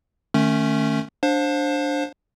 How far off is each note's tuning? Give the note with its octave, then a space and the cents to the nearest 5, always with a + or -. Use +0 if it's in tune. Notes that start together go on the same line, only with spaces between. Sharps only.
D#3 -30 A3 +0 C#4 +0
D4 +0 C5 +20 F5 +35